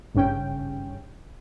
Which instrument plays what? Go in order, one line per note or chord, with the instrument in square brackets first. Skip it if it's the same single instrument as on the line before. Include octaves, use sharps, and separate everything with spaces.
[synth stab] G#1 G2 C#3 C#4 G5